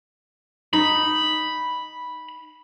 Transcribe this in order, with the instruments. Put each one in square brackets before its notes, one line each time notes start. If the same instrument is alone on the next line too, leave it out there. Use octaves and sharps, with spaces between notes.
[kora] D#4 [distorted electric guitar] B5